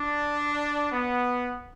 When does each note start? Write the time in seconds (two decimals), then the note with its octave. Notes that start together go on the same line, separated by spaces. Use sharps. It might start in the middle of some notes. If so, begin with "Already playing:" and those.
Already playing: D4
0.92 B3